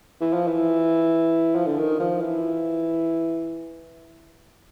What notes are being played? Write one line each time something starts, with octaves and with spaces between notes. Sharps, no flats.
E3
F3
E3
F3
D3
D#3
F3
E3